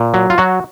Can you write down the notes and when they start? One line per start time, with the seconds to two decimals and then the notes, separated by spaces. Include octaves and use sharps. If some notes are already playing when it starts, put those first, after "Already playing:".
Already playing: A#2
0.14 F#3
0.30 F4
0.38 F#3 F#4